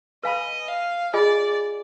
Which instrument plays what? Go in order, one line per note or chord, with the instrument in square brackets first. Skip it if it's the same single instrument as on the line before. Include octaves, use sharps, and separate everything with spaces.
[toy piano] B4 F5 G#5 B5 [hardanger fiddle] D#5
[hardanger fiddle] F5
[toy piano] F4 G#4 D#5 G#5 B5 [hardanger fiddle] D5